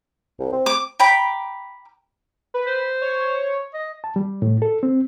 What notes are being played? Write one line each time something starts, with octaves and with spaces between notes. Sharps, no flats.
C2
C4
D6
G5 A#5 B5 D6
B4
C5
C#5
D#5
A5
G3
A2
A4
C4